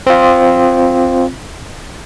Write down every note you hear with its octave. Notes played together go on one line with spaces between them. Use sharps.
C4 F4